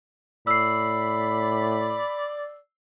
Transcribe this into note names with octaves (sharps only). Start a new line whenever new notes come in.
A2 D5 B5 E6 C7